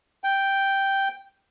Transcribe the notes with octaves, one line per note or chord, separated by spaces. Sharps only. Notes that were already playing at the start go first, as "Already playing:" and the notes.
G5